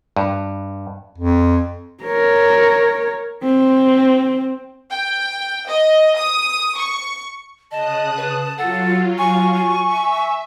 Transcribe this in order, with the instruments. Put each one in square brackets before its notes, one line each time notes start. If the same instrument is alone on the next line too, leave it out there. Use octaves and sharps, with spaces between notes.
[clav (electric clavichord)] G2
[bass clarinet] F2
[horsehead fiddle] A#4 C#5
C4
[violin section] G5
D#5
D#6
C#6
[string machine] C#3 D#6 F#6 [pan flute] D#5 [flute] A5
[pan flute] B4
[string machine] F#3 F4 [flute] A4 [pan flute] F#5
[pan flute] G#5 [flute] C#6
[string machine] E5